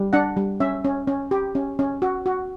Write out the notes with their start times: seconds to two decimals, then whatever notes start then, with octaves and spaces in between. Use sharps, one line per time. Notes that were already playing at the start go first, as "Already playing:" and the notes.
Already playing: G3
0.13 D4 F#5
0.37 G3
0.60 C#4 E5
0.85 C#4
1.07 C#4
1.31 G4
1.55 C#4
1.79 C#4
2.02 F#4
2.26 F#4